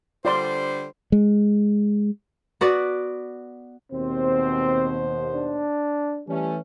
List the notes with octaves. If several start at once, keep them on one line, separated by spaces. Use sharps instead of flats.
D3 G3 F4 C5 D5 C6
G#3
B3 F#4 B4 D5
D#2 B2 C4 C5
D4
E3 G3 A3 C#4